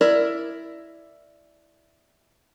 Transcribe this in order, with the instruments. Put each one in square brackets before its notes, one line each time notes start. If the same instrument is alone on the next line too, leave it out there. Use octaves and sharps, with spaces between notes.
[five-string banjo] E4 A#4 D5